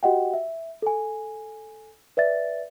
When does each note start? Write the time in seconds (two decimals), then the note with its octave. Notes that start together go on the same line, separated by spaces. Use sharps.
0.03 F#4 G4 D#5 F#5 G5
0.34 E5
0.82 A4 G#5
2.17 B4 D5 E5 A6